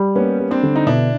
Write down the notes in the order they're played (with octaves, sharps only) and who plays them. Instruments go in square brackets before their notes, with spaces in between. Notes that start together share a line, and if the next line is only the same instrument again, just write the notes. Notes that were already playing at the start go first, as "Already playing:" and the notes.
Already playing: [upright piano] G3
[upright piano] A#3 [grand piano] B3 C#4
[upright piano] G3
[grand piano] C4 D4
[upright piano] D3
[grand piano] D#4
[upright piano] B2 [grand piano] D4 E4